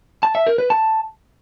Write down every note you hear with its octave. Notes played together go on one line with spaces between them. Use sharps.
A5
E5
A#4
B4
A5